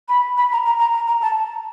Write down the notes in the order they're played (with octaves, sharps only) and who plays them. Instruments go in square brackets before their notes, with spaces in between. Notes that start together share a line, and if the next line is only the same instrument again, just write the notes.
[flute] B5
B5
A#5
A#5
A#5
A#5
A#5
A5